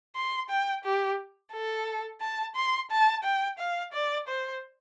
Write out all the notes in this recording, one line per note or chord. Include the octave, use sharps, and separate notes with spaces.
C6
G5
G4
A4
A5
C6
A5
G5
F5
D5
C5